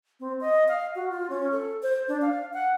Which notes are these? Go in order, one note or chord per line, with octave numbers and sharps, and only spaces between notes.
C4
D#5
F5
F#4
F4
C#4
A4
C5
D4
F5
F#5